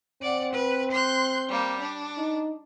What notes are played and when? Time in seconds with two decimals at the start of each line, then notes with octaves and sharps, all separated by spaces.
0.22 C4 D5 F#5
0.54 B4
0.91 C6 F#6 G6
1.48 G3 A#3
1.80 D4
2.18 D#4